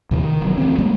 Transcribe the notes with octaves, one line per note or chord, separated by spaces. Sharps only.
D#2 C3 E3
D#3
E1 F#3
D2 E3 F3 C4
F3 G3 G#3 A#3